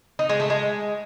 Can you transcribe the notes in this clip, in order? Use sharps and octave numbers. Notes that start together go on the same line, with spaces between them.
D#4
G#3
A3
G#3